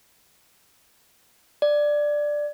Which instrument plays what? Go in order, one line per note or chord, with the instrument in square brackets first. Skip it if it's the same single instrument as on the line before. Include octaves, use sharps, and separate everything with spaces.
[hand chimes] D5